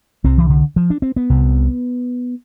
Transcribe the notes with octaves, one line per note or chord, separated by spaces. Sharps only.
C2 C3 C4
E3
D3
F3
D4
C4
B3
C2 C3